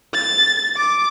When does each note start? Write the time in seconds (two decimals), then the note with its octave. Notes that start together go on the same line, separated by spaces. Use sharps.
0.14 A6
0.77 D6